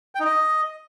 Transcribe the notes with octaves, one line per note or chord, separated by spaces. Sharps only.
G5
D#4
D#5